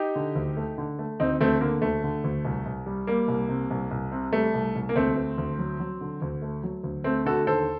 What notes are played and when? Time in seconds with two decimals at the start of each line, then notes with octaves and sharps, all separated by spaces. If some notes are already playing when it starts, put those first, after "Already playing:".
Already playing: D#4 G4
0.16 D3
0.35 D2
0.57 A3
0.78 D3
0.99 A3
1.20 D2 C4 D#4
1.41 D2 A3 C4
1.61 D3 A#3
1.82 D2 A3
2.04 D3
2.24 D2
2.45 C2
2.66 C2
2.86 G3
3.07 G3 A#3
3.28 C2
3.49 C3
3.70 C2
3.91 C2
4.12 C3
4.33 G3 A3
4.54 C2
4.75 C2
4.89 A#3
4.96 D2 A3 C4
5.16 A3
5.38 D2
5.59 F#3
5.80 F#3
6.01 D3
6.22 D2
6.42 A3
6.63 F#3
6.84 D2
7.04 A3 C4
7.26 D3 F#4 A4
7.46 D#2 A4 C5